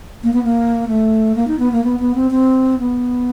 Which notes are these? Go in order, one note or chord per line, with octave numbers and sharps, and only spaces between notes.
A#3
B3
A#3
A3
A#3
D#4
B3
A#3
B3
B3
C4
C4
B3